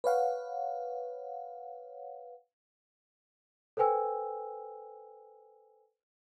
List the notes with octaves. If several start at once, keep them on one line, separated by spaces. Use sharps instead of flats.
B4 C#5 F5 F#5
A4 B4 C5 G5 G#5 E6